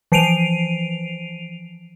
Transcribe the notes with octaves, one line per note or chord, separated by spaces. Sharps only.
E3 F3 C7 D7 D#7 F7